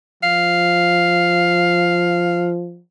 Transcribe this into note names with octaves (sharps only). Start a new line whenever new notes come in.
F3 F5